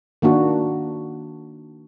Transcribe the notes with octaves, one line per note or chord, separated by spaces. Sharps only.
D#3 A#3 D4 F#4